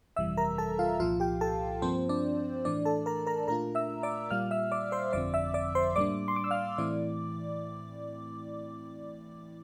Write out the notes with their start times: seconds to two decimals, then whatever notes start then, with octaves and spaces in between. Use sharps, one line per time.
0.16 G1 F2 C3 E3 G3 E5 E6
0.37 A#4 A#5
0.58 A4 A5
0.79 F4 F5
1.00 C2 A#2 F3 F4 F5
1.20 G4 G5
1.41 A4 A5
1.82 G2 F3 A#3 C4 F4 C5
2.09 D4 D5
2.65 A2 E3 A3 D4 D5
2.85 A4 A5
3.06 A#4 A#5
3.27 A#4 A#5
3.48 A#2 A3 D4 F4 A#4 A#5
3.75 E5 E6
4.03 D5 D6
4.30 A#2 G3 A#3 F4 F5 F6
4.51 E5 E6
4.72 D5 D6
4.92 C5 C6
5.13 G1 F2 D3 F3 C4 D5 D6
5.34 E5 E6
5.54 D5 D6
5.75 C5 C6
5.96 A2 G3 A#3 D4 D5 D6
6.28 C6
6.36 D6
6.44 E6
6.51 F5 F6
6.78 A2 E3 A3 C4 E4 D5 D6